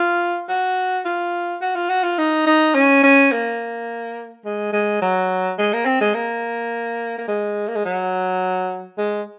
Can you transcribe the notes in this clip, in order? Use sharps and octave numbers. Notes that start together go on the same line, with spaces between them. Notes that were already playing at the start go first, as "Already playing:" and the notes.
Already playing: F4
F#4
F4
F#4
F4
F#4
F4
D#4
D#4
C#4
C#4
A#3
G#3
G#3
F#3
G#3
A#3
C4
G#3
A#3
A#3
G#3
A#3
G#3
F#3
G#3